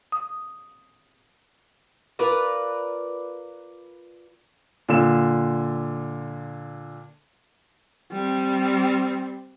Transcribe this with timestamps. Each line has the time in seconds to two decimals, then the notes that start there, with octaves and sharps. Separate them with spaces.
0.12 D#6
2.19 F4 A#4 B4 D5
4.89 A#2 D3 E7
8.12 G3 C4